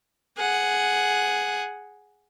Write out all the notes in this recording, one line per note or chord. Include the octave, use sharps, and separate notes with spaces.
G#4 F#5